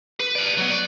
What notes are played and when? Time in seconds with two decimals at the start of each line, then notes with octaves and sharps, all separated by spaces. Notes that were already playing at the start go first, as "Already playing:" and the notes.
0.20 B4
0.35 B4 D5
0.58 F#3 B3
0.70 D5